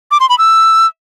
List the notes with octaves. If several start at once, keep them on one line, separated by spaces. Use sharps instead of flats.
D6
C6
B5
E6